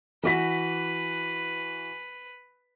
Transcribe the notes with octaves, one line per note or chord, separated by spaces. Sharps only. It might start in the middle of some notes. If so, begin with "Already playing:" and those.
E3 F#4 B4 B6